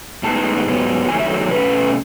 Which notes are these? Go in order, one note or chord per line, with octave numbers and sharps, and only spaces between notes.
A2 G#3 B3 D#4 A5
G#2 F#3 B3
E2 D#3 F#3 A3 G#5
E5
B2 A3 C#4 B4